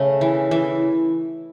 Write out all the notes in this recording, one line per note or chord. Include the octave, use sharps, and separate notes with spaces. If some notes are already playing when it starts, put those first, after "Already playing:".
Already playing: C#3 A3
E3
E3